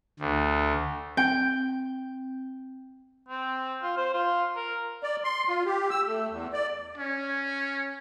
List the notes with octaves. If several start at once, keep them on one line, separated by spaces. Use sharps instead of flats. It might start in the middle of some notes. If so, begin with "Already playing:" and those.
D2
C4 G5
C4
F4
C5
F4
A#4
D5
C6
F4
G4
E6
A3
E2
D5
C#4